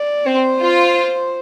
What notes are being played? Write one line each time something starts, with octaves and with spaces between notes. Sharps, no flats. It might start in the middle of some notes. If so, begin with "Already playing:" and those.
Already playing: D5
C4 C5
F4